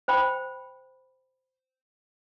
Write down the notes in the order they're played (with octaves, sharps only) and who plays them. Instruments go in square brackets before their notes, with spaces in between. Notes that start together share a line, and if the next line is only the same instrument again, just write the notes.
[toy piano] C5 G5 B5